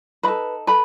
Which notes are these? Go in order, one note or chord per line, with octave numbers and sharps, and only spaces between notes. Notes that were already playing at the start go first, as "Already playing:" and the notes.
D#4 A4 B4 B5
A4 B4 B5